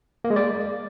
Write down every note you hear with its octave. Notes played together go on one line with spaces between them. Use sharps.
A#3
G#3
D5